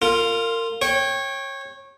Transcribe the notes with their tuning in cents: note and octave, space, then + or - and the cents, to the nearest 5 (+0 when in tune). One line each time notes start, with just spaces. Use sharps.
F4 +0 A#4 -30
C#5 -20 G5 +0